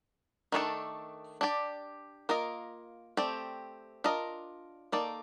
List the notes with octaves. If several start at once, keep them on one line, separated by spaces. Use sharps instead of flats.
D#3 A3 D4 F4 A4
D4 G4 D5
A#3 F4 A#4 D#5
A3 C4 G4 D5
D4 F4 A#4 D#5
D#3 A#3 D#4 A4 D5